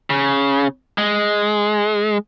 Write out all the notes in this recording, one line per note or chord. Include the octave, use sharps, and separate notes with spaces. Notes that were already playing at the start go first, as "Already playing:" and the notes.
C#3
G#3